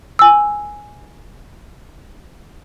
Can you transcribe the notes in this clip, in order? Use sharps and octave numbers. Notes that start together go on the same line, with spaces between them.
G#5 E6